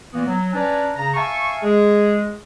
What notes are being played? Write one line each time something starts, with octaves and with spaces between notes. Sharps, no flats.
A#2 E3 A#3 B3
F#3
C#4 D4 B4 D5 G#5 A#5
C#3 A#5
E5 F5 G#5 A5 C#6
G#3 G#4